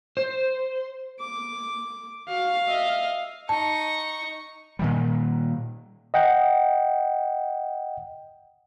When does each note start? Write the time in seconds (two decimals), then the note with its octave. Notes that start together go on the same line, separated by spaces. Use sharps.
0.17 C5
1.19 D6
2.28 F#4 F5
2.68 D#5 E5
3.49 D#4 A5 C#6
4.79 A#2 D#3 G3
6.14 D#5 F#5 G5